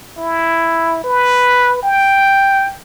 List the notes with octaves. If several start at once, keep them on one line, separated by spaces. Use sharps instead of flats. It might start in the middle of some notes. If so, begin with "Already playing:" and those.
E4
B4
G5